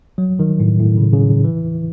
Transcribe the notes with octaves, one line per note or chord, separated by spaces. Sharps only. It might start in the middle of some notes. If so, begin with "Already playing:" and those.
F#3
D#3
A2
A2
C#3
C#3
E3